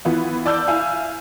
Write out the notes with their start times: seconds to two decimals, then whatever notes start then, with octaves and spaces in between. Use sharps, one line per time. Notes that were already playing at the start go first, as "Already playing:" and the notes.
0.05 E3 B3 F4
0.46 D5 A5 E6 G6
0.67 E4 F5 G#5 E6